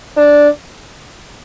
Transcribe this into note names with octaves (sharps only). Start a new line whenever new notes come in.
D4